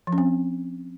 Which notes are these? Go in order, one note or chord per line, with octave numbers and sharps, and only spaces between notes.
F3
C#4
C4